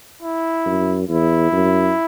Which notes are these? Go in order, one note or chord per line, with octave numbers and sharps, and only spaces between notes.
E4
F#2
E2 E4
F#2